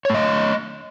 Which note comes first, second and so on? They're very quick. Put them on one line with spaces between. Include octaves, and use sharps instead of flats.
C#5 A3 D#5